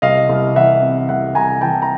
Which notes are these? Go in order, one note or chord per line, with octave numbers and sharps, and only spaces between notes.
C2 D#5 F5
C2
E3 E5 F#5
C3
C2 E5 F#5
C2 G#5 A#5
E3 G5 A5
A#5